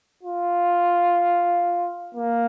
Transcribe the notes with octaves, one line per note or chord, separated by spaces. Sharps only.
F4
A#3